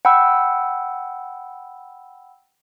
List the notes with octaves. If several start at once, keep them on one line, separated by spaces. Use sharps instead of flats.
F#5 G5 B5 E6